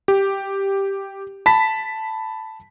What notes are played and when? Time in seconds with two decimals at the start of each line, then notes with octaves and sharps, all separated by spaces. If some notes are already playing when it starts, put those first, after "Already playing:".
0.08 G4
1.46 A5 B5 B6